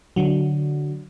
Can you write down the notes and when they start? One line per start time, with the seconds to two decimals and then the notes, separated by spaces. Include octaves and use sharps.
0.16 D3 F#3